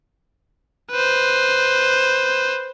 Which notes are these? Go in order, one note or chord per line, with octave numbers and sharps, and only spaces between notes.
B4 C5